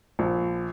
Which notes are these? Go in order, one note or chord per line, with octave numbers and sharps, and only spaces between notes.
A#1